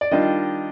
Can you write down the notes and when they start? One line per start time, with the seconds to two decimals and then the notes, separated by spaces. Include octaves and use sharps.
0.01 D5
0.11 D#3 G3 D4 F4 D#5